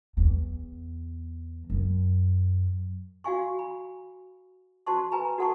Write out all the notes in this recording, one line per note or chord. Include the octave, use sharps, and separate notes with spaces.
E2
F#2
F#4 F5 G#5 C#6
B5
F#4 C5 A5 C6 C#6
B4 G#5 A#5 B5
F#4 A4 F#5 A5 C#6